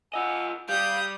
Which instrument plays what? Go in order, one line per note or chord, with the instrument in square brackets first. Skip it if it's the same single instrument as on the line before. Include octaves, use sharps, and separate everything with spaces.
[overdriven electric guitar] F4 D#5 [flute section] F#5 G#5 E6
[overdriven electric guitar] G3 [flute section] F5 G5 [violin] D#6 G6